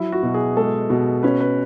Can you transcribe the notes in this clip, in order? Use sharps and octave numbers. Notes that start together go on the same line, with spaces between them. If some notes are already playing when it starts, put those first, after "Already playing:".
Already playing: F#3 E4
F#4
B2
G#4
G#3 A4
B2
C#4 B4
B4